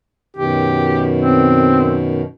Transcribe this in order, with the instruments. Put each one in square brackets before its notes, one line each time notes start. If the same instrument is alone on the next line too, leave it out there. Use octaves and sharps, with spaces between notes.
[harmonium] F#2 B2 D#3 [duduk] G4
[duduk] C4